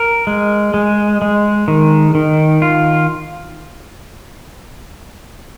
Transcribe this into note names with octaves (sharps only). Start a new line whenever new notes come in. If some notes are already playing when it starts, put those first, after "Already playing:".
Already playing: A#4
G#3
G#3
G#3
D#3
D#3
F4